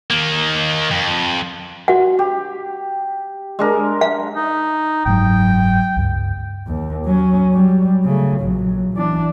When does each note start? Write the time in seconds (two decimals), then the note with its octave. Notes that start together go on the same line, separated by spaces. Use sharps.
0.10 D#3 A#3
0.91 F2
1.88 F#4 F#5
2.19 G4
3.59 G#3 D4 A#4
4.01 F5
4.36 D#4
5.06 F#1 G#2 F#3 G5
5.96 C#2 G2
6.67 D#2
7.06 F#3 C#4
7.53 F#3 G3
8.05 C#3 A3
8.41 A#1 F#3
8.94 E3 D4